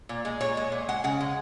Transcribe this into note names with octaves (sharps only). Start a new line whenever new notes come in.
A#2
G#3
A#2 C#5
G#3
A#2
G#3 F#5
C#3 F#5
G#3